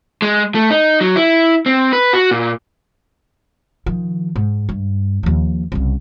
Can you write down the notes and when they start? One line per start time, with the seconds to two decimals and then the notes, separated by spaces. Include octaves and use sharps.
0.22 G#3
0.55 A3
0.70 D#4
1.01 F#3
1.16 E4
1.66 C4
1.93 B4
2.13 F#4
2.31 A#2
3.86 D#3 F3
4.36 G#2
4.69 G2
5.23 D#2 F3
5.72 C2 C#3